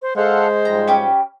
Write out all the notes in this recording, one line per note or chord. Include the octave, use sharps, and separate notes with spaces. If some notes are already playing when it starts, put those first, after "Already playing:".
C5
G#3 A4 C5 F5 F#5
G#2 F3 G3 A#5
C#4 G4 B5